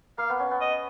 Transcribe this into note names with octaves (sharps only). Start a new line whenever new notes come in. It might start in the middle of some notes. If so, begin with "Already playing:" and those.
A#3 F5
B3
C#4
B3
D#5